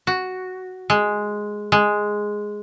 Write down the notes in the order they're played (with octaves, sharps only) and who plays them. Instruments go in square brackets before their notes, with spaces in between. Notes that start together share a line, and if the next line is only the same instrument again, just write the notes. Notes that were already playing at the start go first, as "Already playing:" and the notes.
[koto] F#4
G#3
G#3